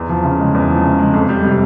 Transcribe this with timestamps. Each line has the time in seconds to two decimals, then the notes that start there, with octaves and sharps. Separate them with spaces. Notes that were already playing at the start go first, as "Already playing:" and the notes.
Already playing: E2
0.09 F3
0.24 C#3
0.38 G#3
0.54 E2
0.69 F3
0.84 C#3
0.99 G#3
1.14 F2
1.29 G3
1.44 C3